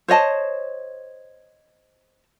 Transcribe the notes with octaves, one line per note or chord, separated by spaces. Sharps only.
C5 C#5 D#5 A5